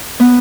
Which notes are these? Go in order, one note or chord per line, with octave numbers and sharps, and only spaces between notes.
B3